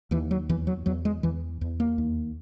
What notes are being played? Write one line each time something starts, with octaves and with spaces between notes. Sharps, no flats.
D#2 E3
F#3
E2 E3
F#3
E2 F#3
G#3
E2 E3
E2
A#3
D#2